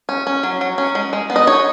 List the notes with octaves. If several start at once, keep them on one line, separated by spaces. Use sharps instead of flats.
C#4
C#4
F#3
F#3
C#4
G#3
G#3
B3
D#5
D#4 C#5